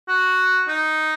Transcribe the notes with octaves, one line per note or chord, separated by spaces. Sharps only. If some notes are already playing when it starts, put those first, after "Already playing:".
F#4
D#4